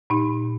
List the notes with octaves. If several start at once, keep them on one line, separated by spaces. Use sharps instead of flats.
A#2 D#4